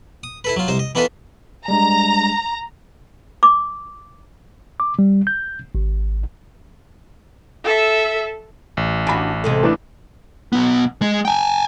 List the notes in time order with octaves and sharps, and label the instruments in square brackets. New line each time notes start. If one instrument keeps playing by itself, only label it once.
[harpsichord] D#6
E4 A4 B4
F#3 F4
C2 D#4 C5
D#5
E3 B3 D#4 F4 A4 B4
[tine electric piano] G3 G#3 D4 [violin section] A#5
[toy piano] D6
[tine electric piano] D6
G3
G6
G#1
[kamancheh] A4 E5
[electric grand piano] A1
[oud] D4 F#4 [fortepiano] G#5 B5
[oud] C3 G#3 A4
[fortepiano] E3 A3 D4
[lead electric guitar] B1 B3
G#3
G5 G#5